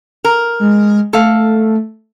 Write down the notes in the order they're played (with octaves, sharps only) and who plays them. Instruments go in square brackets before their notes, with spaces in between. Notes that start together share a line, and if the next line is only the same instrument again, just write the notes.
[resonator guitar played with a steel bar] A#4
[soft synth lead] G#3
[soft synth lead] A3 [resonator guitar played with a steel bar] A4 F5